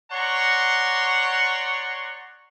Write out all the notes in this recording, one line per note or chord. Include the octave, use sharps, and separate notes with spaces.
C#5 D5 F#5 A#5 C6 C#6